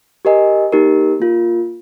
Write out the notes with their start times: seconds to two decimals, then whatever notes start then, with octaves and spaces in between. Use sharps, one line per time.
0.25 G4 A#4 D#5 G#5
0.72 A#3 D#4 G4 A#4
1.20 A#3 F4 A#4